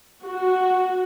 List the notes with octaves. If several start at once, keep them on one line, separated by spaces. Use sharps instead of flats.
F#4